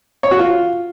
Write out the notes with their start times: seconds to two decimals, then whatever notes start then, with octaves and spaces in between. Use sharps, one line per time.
0.23 C#5
0.31 F#4
0.39 F4